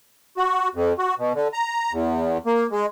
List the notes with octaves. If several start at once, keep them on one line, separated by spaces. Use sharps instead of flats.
F#4
F2
F#4
B2
D3
A#5
E2
A#3
G#3